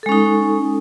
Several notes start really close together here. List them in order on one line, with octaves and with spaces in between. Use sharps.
A4 G#3 C#4 D#4